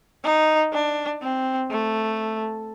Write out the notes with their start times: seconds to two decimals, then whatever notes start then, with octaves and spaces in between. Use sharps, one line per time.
0.24 D#4
0.73 D4
1.22 C4
1.71 A3